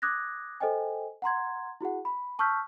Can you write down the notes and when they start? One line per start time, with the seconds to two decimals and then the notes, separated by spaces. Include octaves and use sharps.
0.02 D6 D#6 F#6 G#6 A#6
0.60 A4 C5 D#5 G5 G#5
1.22 F#5 A#5 C6 G#6
1.81 E4 F#4 G#4 F#5
2.05 B5
2.39 A5 C#6 E6 F6 G6 B6